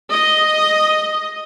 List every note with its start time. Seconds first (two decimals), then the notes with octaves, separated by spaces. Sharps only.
0.11 D#5